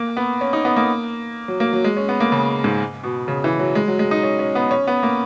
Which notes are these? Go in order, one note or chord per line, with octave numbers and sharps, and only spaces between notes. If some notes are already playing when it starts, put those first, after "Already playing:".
Already playing: A#3
B3
C#4
D#4
B3
A#3
F#3
A#3
F#3
G#3
C#4
B3
A#3
C#3
G#2
B2
C#3
E3
F#3
G#3
F#3
G#3
D#4
C#4
C#4
B3
C#4
B3
A#3